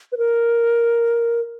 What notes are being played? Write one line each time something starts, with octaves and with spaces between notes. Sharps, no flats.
B4
A#4